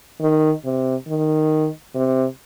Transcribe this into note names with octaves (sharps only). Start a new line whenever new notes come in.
D#3
C3
D#3
C3